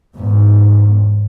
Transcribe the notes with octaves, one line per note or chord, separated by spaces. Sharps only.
E2 G#2